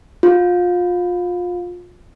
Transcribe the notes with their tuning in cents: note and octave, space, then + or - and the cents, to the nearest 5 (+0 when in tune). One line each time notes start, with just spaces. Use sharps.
F4 +25